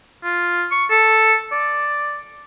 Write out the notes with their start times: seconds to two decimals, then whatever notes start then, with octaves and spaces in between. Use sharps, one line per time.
0.24 F4
0.71 C#6
0.91 A4
1.52 D5